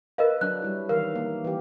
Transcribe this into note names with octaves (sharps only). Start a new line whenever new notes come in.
A#4 B4 D#5 F5
F#3 D4 F#6
G3 E4
D#3 E3 A#4 F5
A#3
E3 G4